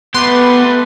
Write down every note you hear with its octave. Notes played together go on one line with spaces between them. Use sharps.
A3 B3 G4 B4 C6